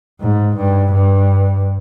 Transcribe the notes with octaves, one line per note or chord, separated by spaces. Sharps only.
G#2
G2
G2